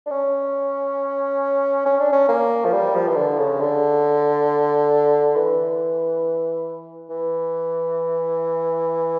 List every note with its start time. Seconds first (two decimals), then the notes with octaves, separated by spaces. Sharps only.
0.06 D4
0.10 C#4
1.85 C#4
1.99 D4
2.12 C#4
2.28 A#3
2.65 F3
2.72 G3
2.95 F3
3.08 E3
3.16 D3
3.39 C#3
3.60 D3
5.36 E3
7.10 E3